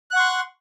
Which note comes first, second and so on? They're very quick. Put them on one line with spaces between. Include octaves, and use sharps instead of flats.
F#6 F#5 C#6 C6